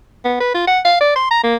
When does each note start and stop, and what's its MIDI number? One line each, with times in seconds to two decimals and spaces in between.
0.25 0.37 59
0.40 0.54 71
0.54 0.65 65
0.67 0.80 78
0.85 0.96 77
1.01 1.13 74
1.16 1.30 84
1.31 1.43 82
1.43 1.56 58